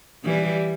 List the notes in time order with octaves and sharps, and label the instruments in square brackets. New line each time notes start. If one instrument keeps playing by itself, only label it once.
[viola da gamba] E3 G3